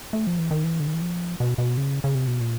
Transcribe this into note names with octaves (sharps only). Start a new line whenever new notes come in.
A3
F3
E3
D#3
E3
D3
D#3
E3
F3
B2
B2
C#3
C#3
C3
B2
A#2